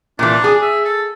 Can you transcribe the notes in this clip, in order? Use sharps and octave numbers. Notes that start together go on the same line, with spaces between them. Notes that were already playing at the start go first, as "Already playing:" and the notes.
A#2 E3 D4
G#4
E5
A4